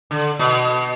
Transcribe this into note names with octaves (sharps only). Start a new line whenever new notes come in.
D3
B2